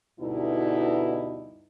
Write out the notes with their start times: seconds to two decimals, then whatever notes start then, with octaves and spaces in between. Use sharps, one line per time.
0.20 D2 G2 B2 D#4 E4